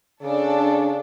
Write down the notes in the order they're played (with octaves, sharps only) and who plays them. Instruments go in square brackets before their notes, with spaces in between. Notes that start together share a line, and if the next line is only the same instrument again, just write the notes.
[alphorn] C#3 [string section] D4 A4